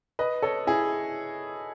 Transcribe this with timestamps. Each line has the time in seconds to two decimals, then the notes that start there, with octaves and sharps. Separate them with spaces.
0.19 B4 D#5
0.42 A4 C#5
0.67 E4 G#4